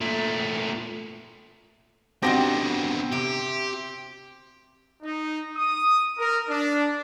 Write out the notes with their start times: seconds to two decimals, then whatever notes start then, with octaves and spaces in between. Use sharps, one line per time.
0.01 A#2 A3
2.22 B2 D3 D#3 C4 F#4 G4 A#6 G7
3.12 C3 G4
5.03 D#4
5.57 D#6
6.19 A#4
6.49 D4